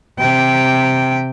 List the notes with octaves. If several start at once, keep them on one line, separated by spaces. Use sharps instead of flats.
C3 G5